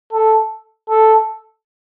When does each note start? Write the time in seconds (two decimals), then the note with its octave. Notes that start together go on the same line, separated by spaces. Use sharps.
0.13 A4
0.90 A4